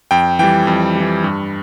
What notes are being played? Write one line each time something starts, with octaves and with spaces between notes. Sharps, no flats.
F2 G5
E3 G3 G5
F2
E3 G3
G2